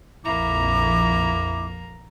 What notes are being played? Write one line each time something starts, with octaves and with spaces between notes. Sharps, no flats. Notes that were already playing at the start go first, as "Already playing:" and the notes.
A#1 F2 A#3 E4 A#5 D6